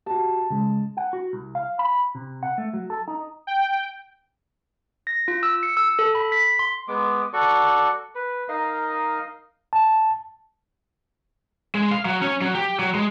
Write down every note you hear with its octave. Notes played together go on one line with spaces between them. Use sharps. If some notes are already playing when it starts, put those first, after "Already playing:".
F#4 G4 A5
C#3 G#3
F#5
F#4
C2
F5
B5
C3
F#5
A3
F#3
A4
D#4
G5
A#6
F4
E6
C#7
E6
A4
B5
B6
C6
G#3 B3 D6
F#4 A4 D5 C#6
B4
D#4 A#4 D#5 F5
A5
G#3
F5
F#3
C#4
F#3
G4
F#3
G#3